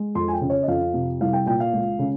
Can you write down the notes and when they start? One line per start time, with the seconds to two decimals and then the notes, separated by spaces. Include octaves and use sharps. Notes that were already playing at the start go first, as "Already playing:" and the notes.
Already playing: G#3
0.15 F2 C6
0.28 G#5
0.33 G5
0.41 C#3
0.50 C#5
0.63 D#5
0.68 F2 F5
0.94 C3
1.21 C2 F5
1.33 G5
1.46 A#2 G5
1.60 F5
1.73 C#2
1.99 C#3